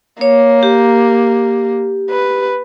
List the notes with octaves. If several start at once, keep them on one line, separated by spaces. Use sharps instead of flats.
A#3 C#5
G4
B4